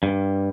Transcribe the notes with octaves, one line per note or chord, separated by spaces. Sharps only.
G2